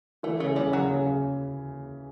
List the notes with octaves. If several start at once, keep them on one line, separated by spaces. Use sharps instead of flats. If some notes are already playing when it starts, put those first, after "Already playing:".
E3 A3
C#3 A3
C#3 G3
C#3 F#3
C#3
C#3